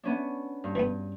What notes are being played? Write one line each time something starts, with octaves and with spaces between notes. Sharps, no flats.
B3 C#4 D4
G2
E3 B3